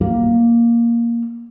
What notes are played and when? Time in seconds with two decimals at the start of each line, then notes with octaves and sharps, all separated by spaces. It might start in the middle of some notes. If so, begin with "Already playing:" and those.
0.01 A#3